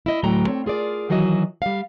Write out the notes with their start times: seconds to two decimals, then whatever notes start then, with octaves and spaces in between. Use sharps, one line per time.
0.06 E4 D#5
0.23 D2 A2 F#3 G5 A#5
0.47 C4 C#5
0.66 F4 G#4 A#4 D5
1.10 D#3 E3 F#3 F#4 D#5
1.62 G3 F5